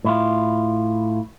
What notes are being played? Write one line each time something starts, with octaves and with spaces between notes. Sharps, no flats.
A2 E4 F4